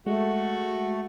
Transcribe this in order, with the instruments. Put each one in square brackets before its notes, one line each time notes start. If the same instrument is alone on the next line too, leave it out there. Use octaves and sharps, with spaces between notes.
[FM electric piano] G#3 [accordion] A3 [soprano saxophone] F#4